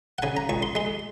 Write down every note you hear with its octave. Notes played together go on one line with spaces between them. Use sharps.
F#5
C#3 G#5
A#5
C#2 C#6
C6
G#3 C6